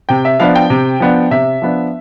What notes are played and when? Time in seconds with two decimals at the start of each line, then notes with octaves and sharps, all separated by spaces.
0.09 C3 G5
0.25 E5
0.40 F3 B3 D4 F5
0.55 G5
0.70 C3
1.00 F3 B3 D4
1.31 C3 E5
1.62 F3 B3 D4